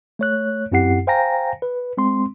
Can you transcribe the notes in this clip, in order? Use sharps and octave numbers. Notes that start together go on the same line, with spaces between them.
A3 C#5 F#6
F#2 C4 E4 G4 F#5 C7
C5 F5 G5 G#5 A#5 A#6
B4
G#3 C4 C6